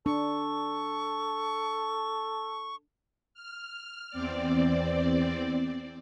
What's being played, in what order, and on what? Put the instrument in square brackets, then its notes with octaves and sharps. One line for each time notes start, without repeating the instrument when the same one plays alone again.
[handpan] D4 [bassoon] A4 [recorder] C#6
[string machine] F6
E2 C4 D5